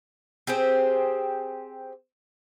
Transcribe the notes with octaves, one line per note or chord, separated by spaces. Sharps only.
C4 G4 G#4 C5